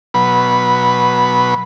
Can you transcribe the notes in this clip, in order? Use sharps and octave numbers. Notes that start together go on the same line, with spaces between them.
B2 F#3 B4 B5